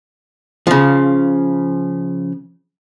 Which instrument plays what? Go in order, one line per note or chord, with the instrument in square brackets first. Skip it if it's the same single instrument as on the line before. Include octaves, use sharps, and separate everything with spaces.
[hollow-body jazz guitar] C#3 F3